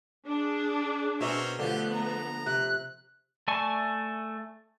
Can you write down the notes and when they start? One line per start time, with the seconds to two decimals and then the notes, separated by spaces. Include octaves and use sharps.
0.27 D4 G#4
1.21 B2 C4 C#4 A#4 E5
1.59 D3 F3 A3 B3 G4
1.92 A#5
2.46 C3 F#6
3.48 A3 D5 G#5 A5 C#6